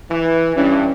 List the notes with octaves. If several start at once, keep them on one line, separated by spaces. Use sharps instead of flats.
E3
G2 E3 C#4